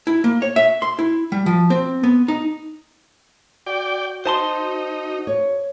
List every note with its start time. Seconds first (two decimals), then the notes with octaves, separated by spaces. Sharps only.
0.07 E4
0.24 A#3
0.42 C#5
0.56 E5
0.82 C6
0.99 E4
1.32 G3
1.46 F3
1.70 C4
2.03 B3
2.28 D#4
3.66 F#4 D5 G5
4.25 D#4 C5 A5 C6
5.27 C#5